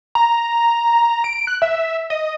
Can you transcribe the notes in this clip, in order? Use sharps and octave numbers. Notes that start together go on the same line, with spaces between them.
A#5
D7
F#6
E5
D#5